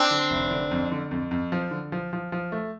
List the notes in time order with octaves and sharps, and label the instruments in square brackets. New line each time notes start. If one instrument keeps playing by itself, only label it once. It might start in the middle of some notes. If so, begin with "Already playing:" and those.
Already playing: [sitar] C4 D4
[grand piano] D3
F1
D3
F2
D3
F2
F2
F3
D3
F3
F3
F3
A3